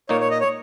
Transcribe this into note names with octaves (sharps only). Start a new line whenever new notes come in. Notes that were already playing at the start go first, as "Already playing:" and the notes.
A#2 A#3 D#4 C#5
C#5
D#5
C#5